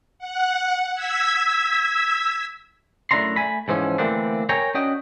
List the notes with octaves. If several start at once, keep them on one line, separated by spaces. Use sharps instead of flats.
F#5
E6 G#6 B6
F#2 A3 D4 E4 A#5 C6
A3 G#5 B5
G#2 E3 F3 C#4
D3 E3 A3 A#3 C4 D4
A#4 C#5 G5 G#5 A#5
C#4 D4 F#4 D#5 G5